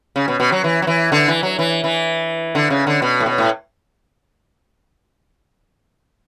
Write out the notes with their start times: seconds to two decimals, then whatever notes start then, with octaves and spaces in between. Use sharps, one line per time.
0.16 C#3
0.28 B2
0.40 B2
0.52 F#3
0.64 E3
0.82 F#3
0.87 E3
1.12 D3
1.28 E3
1.43 F#3
1.59 E3
1.84 E3
2.55 D3
2.70 C#3
2.87 D3
3.02 B2
3.20 A2
3.26 B2
3.38 A2